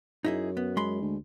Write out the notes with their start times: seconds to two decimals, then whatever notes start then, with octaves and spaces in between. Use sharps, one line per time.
0.25 F#2 D#4 E4 G#4
0.57 B3
0.77 G#3 B5 C6
1.01 D2